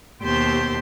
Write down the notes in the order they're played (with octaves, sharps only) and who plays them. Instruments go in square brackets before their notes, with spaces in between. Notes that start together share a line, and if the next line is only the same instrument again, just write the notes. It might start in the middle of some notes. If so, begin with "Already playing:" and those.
[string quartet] D#2 B2 G4 C5 A5 C6